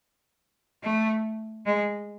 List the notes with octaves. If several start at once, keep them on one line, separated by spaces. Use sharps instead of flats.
A3
G#3